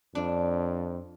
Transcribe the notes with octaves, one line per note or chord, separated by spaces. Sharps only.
F2 D4